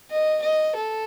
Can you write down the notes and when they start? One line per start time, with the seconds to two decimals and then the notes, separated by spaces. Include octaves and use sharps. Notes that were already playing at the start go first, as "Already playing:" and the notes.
0.11 D#5
0.42 D#5
0.76 A4